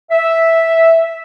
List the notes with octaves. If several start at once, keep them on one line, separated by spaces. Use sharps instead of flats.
E5